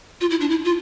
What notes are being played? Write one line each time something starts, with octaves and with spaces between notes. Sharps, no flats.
F4
E4
D4
E4
F4